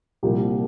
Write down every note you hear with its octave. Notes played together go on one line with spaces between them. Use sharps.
C2 A#2 F3 A#3 G4